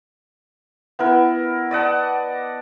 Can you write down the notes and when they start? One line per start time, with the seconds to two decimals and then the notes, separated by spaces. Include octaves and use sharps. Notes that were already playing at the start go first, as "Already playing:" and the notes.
0.99 B3 E4 A#4
1.71 D5 D#5 F#5 A5